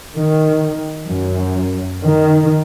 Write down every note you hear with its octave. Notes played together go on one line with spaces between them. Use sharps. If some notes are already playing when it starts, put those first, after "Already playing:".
D#3
F#2
D#3